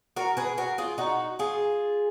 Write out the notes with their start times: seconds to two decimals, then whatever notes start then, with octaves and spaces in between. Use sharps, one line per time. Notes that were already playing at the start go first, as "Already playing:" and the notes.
0.16 F#4 A#4
0.37 G#4 B4
0.58 F#4 A#4
0.78 F4 G#4
0.98 D#4 F#4
1.39 F4 G#4